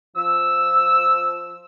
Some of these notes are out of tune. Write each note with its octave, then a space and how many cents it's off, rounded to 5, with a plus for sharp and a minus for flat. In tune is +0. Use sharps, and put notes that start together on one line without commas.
F3 +0 E6 +0